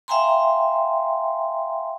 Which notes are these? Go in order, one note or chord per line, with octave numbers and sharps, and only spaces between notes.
E5 F5 G5 G#5 A#5 C6